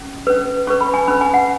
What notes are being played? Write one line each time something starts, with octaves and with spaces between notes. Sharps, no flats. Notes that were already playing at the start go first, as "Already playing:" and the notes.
Already playing: C#4
C#4 B4
C#4 B4 C#6
B5
G#5
C#4 B4 B5
G#5
F#5